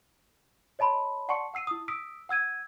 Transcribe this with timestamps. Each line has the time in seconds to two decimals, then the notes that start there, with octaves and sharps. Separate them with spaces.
0.79 C#5 D#5 A5 B5 C6
1.28 D5 F#5 A5 C6 C#6 C#7
1.54 F#5 E6 C7 D#7
1.67 E4 D#6
1.88 D#6 E6 B6 D7
2.29 F#5 E6 G#6 D#7